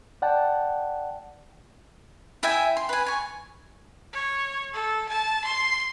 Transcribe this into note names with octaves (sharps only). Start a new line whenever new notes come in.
D5 F#5 G5 A5
E4 E5 G5 G#5
C6
B4 G#5
G#5 C#6
C#5
A4
A5
C6